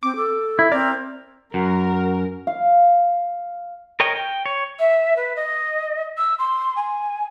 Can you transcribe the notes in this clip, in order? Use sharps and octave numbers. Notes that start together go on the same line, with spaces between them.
C4 D6
A4
E4
C4 A#4 D5
F#2 F#4 A#4
F5
A#4 C#5 D#5 G5
G5
C#5
E5
B4
D#5
E6
C6
G#5